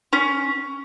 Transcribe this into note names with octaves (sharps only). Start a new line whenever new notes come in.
C#4